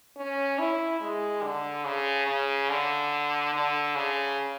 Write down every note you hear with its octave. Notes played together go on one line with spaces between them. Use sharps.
C#4
E4
G#3
D3
C#3
C#3
D3
D3
C#3